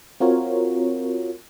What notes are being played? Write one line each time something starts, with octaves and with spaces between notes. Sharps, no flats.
C4 F4 F#4 A#4 C#5